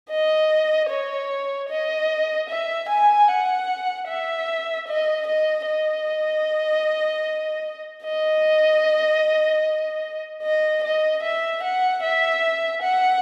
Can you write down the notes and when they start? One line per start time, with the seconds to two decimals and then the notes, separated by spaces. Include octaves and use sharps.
0.11 D#5
0.90 C#5
1.69 D#5
2.49 E5
2.89 G#5
3.28 F#5
4.08 E5
4.88 D#5
5.27 D#5
5.66 D#5
8.05 D#5
10.43 D#5
10.84 D#5
11.23 E5
11.63 F#5
12.03 E5
12.82 F#5